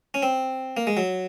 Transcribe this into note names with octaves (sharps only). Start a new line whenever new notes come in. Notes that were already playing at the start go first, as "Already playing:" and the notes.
C#4
C4
A#3
G#3
F#3